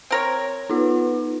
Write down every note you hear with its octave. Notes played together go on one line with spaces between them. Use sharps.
C4 A#4 C#5
B3 D#4 F4